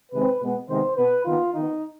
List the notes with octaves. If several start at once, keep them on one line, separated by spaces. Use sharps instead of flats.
C3 D#3 G#3 C4 B4
B2 G#3 B3
C3 D#3 G#3 B3 C5
B2 B3 B4
D#3 B3 F4
D#3 B3 D#4